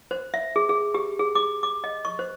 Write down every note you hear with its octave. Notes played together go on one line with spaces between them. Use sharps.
C5
E5
G#4
G#4
G4
G#4
D6
D6
D#5
C#6
C5